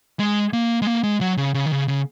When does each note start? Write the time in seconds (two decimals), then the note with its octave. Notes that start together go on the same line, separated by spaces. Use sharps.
0.19 G#3
0.53 A#3
0.82 G#3
0.87 A#3
1.04 G#3
1.21 F#3
1.37 C#3
1.54 C#3
1.66 D#3
1.71 C#3
1.88 C#3